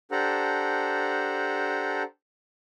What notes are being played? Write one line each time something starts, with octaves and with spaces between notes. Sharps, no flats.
D4 G4 A4 C5 F#5 A#5